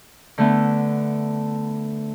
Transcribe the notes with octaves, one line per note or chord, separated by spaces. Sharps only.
D3 A3 B3